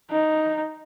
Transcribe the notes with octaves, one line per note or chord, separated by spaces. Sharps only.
D#4